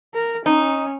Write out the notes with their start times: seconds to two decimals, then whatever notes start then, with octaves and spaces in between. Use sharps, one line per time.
0.14 A#4
0.46 C#4 D#4